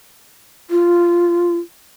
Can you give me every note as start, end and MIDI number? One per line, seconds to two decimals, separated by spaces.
0.70 1.57 65